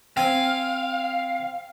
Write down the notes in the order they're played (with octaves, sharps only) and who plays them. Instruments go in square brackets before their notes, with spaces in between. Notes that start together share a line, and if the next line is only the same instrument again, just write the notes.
[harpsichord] C4 G#5 [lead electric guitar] F5